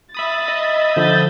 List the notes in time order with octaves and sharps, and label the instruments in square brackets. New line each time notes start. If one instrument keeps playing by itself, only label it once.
[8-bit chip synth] E5 B5 D#6 [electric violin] A6
[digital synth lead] D#5
[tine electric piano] D3 F3 [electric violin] G6 A6